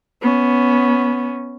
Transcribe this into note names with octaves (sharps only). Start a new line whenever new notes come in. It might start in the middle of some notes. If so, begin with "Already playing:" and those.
B3 C#4